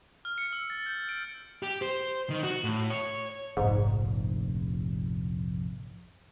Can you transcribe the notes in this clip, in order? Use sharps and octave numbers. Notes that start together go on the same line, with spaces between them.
F6
C#7
E6
A6
G6
D7
G4
C5
D#3
F#4
A2
C#5
F1 A#1 G#2